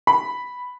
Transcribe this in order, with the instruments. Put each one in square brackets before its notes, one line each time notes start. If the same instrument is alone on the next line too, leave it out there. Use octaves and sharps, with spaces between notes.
[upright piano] B5